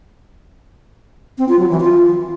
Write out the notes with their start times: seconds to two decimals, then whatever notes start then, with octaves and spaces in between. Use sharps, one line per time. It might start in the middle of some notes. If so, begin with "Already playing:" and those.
1.38 C4
1.49 F4
1.59 F#3
1.70 E3
1.80 F4